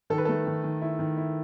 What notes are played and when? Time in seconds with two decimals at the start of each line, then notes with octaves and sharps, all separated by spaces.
0.10 D#3 A4
0.18 B4
0.25 A3 A4
0.47 D#3
0.64 D#3
0.82 E4
0.99 D#3
1.17 E4